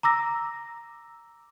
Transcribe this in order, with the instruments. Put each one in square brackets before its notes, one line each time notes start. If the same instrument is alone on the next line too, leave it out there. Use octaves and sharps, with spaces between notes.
[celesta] A#5 D6 E6 A#6